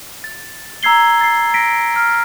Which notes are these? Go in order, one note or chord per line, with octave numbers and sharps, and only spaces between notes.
A6
A#5 E6 G#6 C7 G7
A6 C7
A#6 B6 D7
F6